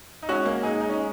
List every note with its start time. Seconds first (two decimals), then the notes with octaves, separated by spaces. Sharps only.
0.23 D#4
0.28 G#3 C#4 F#4
0.46 A#3
0.63 G#3 D#4 G#4
0.81 D#4
0.89 C#4
0.98 G#3